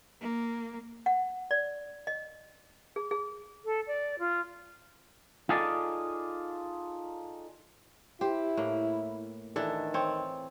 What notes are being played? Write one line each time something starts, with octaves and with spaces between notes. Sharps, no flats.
A#3
F#5
D5
D#5
G#4
G#4
A4
D5
F4
D#4 F4 G#4 A4 D5
E4 G4 C5
A2 A#3
D#3 E3 D4 A4
C4 C#5